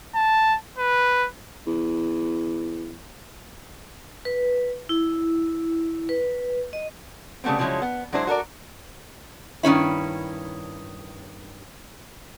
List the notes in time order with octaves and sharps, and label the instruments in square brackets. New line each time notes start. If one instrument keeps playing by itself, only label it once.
[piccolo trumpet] A5
B4
[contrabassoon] E2
[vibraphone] B4
E4
B4
D#5
[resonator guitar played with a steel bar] C#3 G3 A3 B3 C4
C#3 F3 F#3 G#3 C#4 E4
B3
F#3 G#3 D4 E4 C5
F#4 A4 A#4 D5
G2 D#3 C#4 E4